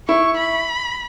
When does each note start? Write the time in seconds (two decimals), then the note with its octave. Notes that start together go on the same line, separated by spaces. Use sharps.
0.08 E4 C#6
0.37 B5